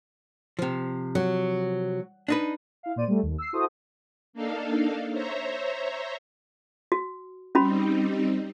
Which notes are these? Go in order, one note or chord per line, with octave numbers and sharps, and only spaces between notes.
C3 F3
F#3
D4 D#4 B4
E4 F5
A#2 C5 D5 D#7
G3 A3
D#2
E6 C7
E4 F#4 A4 C5 D#6
A#3 D4 D#4 A4 F5
C5 C#5 E5 A#5
F#4
G3 C4 C#4 D#4 F#4 B5